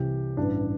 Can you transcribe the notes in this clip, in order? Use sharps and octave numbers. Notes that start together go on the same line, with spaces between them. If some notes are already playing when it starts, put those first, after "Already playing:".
Already playing: C2 C3 E3 G4
A1 G2 E3 D4